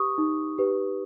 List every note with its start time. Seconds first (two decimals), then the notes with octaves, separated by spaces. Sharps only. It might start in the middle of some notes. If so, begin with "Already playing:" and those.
Already playing: G4 B4 C#6 D#6
0.18 D#4
0.58 G4 B4